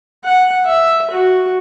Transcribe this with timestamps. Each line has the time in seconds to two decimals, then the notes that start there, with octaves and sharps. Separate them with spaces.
0.25 F#5
0.65 E5
1.11 F#4